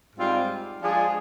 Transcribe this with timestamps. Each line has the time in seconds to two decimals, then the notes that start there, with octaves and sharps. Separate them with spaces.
0.15 G#2 G3 C4 F4
0.82 F3 G#3 D4 F4 G#4